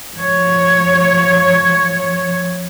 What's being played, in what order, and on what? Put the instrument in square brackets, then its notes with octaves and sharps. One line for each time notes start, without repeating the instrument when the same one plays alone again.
[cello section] F3 C#5